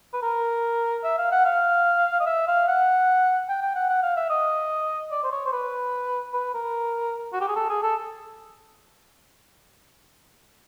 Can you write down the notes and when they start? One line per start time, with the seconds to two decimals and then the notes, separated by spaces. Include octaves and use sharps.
0.13 B4
0.23 A#4
1.04 E5
1.18 F5
1.32 F#5
1.45 F5
2.20 D#5
2.27 E5
2.47 F5
2.68 F#5
3.49 G5
3.62 G5
3.75 F#5
3.89 F#5
4.03 F5
4.16 E5
4.30 D#5
5.12 D5
5.24 C5
5.32 C#5
5.46 C5
5.52 B4
6.34 B4
6.54 A#4
7.33 F#4
7.41 G4
7.48 G#4
7.56 A4
7.70 G#4
7.83 A4